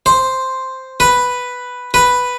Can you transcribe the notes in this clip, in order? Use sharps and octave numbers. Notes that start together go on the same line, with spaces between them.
C5
B4
B4